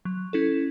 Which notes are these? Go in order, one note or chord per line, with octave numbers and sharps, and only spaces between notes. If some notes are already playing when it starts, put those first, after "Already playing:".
F#3
C#4 E4 A4